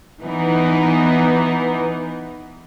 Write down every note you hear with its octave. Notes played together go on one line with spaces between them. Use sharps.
E3 B3 D#4